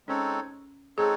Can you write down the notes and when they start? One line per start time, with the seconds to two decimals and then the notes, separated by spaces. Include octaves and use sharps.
0.08 G#3 C4 C#4 D#4 A4 C#5
0.98 G#3 C4 D#4 G#4 A4 C#5